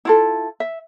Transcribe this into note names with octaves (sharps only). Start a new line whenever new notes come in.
E4 F4 A4
E5